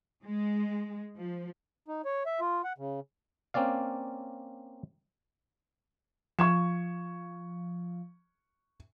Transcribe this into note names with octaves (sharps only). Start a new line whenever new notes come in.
G#3
F3
D#4
C#5
E5
F4
F#5
C#3
A#3 C4 C#4 D5 F5
F3 C#6 G#6 E7